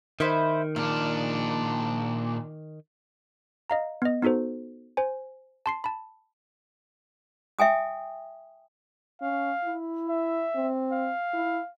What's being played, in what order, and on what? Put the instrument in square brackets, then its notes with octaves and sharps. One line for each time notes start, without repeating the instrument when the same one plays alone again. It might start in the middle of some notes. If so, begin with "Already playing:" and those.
[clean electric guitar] D#3 [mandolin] E4 B4 C5
[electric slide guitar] A#2 D4 [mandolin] F6
[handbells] D#5 F5 A#5
B3 D#5
B3 D#4 F#4 A4 C5
C5 G#5
A5 C6 C7
A5 B5
[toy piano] E5 G5 G#5 D#6
[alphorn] C#4 [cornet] F5
[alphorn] E4
[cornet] E5
[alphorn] C4
[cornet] F5
[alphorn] E4